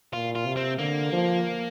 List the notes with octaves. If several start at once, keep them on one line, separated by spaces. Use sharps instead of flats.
A#2 F4
F4
C3
C4
D3 A#3
F3